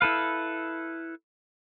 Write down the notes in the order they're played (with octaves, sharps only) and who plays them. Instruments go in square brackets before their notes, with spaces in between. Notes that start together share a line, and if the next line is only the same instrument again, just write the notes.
[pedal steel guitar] E4 A4 B4 F5